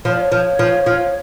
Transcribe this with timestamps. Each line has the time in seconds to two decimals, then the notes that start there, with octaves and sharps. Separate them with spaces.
0.05 F3 C#5
0.13 D5
0.20 C#5
0.32 F3
0.59 F3
0.86 F3